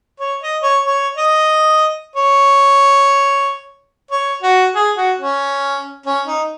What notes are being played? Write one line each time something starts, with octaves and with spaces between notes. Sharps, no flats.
C#5
D#5
C#5
C#5
D#5
C#5
C#5
F#4
G#4
F#4
C#4
C#4
D#4